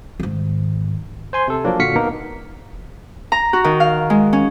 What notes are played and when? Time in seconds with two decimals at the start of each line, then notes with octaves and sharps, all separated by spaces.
0.20 G#2 D#3
1.33 C5 G#5 C6
1.48 C3 A4
1.64 F3 F#3 A#3 D4
1.79 A#2 D3 F#4 F5 B6 C#7
1.96 A#3 B3 D#4 A#4
3.32 A#5
3.53 F#4
3.64 D#3
3.80 F5
4.10 G#3
4.33 C#4